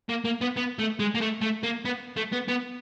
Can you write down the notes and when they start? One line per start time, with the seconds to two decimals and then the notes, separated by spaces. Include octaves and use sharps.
0.09 A#3
0.25 A#3
0.41 B3
0.56 B3
0.79 A3
0.99 G#3
1.15 A#3
1.21 A3
1.41 A3
1.63 A#3
1.85 B3
2.17 A3
2.33 B3
2.48 B3